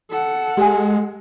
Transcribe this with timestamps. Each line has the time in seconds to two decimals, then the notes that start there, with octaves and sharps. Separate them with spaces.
0.10 A4 F#5
0.57 G#3 G4 G#5